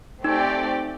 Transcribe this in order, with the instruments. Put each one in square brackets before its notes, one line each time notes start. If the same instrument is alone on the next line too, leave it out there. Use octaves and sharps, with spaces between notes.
[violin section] A3 C4 G4 D5 G5 [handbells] D#4